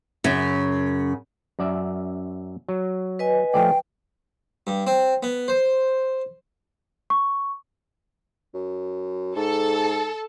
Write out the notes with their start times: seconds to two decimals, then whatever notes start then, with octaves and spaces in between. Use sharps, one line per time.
0.24 F#2 C#3
1.59 F#2 D5 E5
2.69 F#3
3.19 B4 D#5 G#5
3.54 F3 A3 D5 G5
4.67 G2
4.87 C4
5.23 B3
5.48 C5
7.10 C#6
8.54 F#2
9.36 G#2 A4